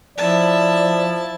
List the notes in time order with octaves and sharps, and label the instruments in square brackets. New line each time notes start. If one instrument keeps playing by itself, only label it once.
[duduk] F3 [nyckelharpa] E4 A5 [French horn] D5